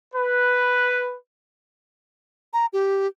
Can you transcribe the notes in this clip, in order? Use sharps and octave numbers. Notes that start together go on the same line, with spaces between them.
B4
A#5
G4